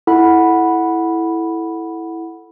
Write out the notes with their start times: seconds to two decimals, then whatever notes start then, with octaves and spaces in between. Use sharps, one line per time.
0.07 E4 A4 F#5 B5